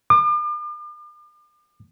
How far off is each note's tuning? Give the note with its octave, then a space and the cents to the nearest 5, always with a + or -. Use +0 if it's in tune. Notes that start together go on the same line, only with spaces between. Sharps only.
D6 +45